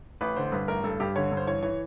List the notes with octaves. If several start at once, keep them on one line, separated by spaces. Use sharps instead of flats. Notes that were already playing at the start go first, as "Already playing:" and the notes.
A1 B4
D3 C5
G2 B4
A1 A#4
G2 A4
G2 G4
D3 C#5
G2
C5
E3 C#5
E3 C#5